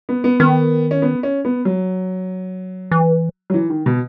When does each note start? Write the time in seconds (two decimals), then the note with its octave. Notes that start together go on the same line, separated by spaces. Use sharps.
0.09 B3
0.24 B3
0.40 D#3 B3
0.91 C#4
1.02 B3
1.23 C#4
1.45 B3
1.65 F#3
2.91 E3
3.50 F#3
3.54 E3
3.70 D#3
3.86 B2